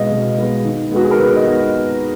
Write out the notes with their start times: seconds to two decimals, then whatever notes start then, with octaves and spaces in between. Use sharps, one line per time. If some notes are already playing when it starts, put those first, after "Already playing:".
Already playing: B2 G#3 B3 D#5 F5
0.11 B2
0.38 G#3 B3
0.65 D#3
0.92 G#3 B3 F#4
1.04 G#4
1.11 A#4
1.18 D#3 B4
1.36 D#5
1.45 G#3 B3